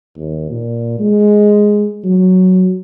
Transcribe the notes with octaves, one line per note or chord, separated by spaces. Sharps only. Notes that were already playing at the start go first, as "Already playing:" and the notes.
D#2
A#2
G#3
F#3